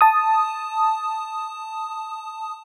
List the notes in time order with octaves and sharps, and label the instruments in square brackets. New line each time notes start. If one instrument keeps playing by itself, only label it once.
[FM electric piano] A5 D#6